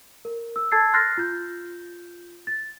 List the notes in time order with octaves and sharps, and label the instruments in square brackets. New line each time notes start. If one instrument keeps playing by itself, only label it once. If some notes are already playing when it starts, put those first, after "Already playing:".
[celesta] A#4
E6
A4 A5 E6 G#6 A6 C7
C6 F6 F#6 A6 A#6 C7
F4 G6
A6